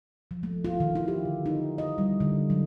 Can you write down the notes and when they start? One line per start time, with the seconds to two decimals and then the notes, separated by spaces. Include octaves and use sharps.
0.31 F3
0.43 A3
0.65 F4
0.80 D#3
0.95 E4
1.08 G4
1.25 D3
1.46 D#4
1.78 D#5
1.98 G3
2.20 D3
2.50 F#3